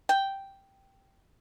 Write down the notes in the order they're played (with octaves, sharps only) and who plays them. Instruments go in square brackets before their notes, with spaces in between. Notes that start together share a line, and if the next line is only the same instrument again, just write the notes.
[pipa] G5